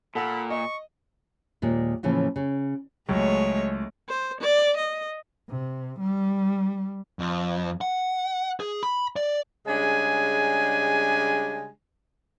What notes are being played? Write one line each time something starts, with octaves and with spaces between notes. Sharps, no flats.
A#2 A4 F#5 B5 E6
D#5 C#6
D#2 A#2 G#3
A2 C#3 E3 F3 A#3
C#3
C#2 F#3 G#3 A3 C#5
C5
D5
D#5
C3
G3
F2
F#5
G#4
B5
D5
C#3 G3 G#3 D4 G#5